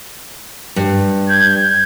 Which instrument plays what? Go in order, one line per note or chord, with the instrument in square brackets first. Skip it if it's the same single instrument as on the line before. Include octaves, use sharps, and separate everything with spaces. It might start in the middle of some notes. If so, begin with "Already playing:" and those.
[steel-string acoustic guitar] G2
[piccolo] G6 [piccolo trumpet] G#6